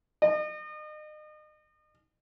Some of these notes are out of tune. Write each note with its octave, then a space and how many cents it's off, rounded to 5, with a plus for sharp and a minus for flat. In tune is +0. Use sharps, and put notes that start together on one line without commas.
D#5 -35